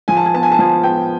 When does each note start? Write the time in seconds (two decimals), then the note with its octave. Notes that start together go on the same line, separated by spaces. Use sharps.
0.08 F3 G#5
0.17 A5
0.26 G#5
0.33 B3 A5
0.43 G#5
0.52 A5
0.59 F3 G#5
0.83 B3 G5